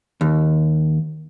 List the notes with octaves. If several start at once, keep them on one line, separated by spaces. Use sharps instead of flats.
D#2